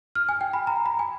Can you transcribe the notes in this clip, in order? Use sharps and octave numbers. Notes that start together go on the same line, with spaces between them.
F6
G#5
G5
B5
A#5
B5
G#5